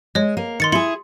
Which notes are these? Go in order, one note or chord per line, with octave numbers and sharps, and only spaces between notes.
G#3 C#5 D#5
A#3
D#3 C6 A6 C#7
E4 G#4 C6 C#7 F#7